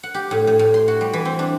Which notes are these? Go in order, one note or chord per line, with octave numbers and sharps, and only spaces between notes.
F#5
G4
A2
A2
A2
C6
F#4
G3
E3
C4
D4